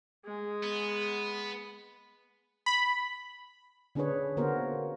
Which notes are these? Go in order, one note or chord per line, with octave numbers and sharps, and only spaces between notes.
G#3
B3
B5
D3 C#4 D4 G#4 B4 C#5
D3 A#3 B3 F#4 A#4 C5